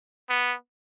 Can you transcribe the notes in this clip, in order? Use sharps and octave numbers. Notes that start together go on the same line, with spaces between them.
B3